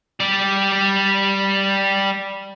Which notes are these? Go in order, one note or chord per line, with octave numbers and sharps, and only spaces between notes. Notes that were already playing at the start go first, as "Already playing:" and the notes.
G3 D5